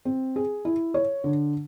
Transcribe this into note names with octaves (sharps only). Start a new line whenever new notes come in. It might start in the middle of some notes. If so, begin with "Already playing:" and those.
C4
G#4
E4
C#5
D3